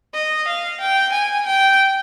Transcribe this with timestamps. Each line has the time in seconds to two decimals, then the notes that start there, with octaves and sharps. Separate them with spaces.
0.15 D#5
0.48 F5
0.81 G5
1.13 G#5
1.47 G5